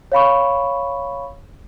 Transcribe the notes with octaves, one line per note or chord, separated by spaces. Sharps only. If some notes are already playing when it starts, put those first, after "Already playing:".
C#5 F5 B5 C#6